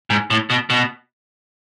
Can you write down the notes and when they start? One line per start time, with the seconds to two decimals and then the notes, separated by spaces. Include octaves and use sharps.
0.10 G#2
0.30 A2
0.50 B2
0.70 B2